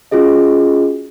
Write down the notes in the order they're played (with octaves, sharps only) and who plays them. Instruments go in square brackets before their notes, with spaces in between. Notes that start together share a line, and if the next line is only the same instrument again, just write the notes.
[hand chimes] C#4 F4 F#4 G#4 D#5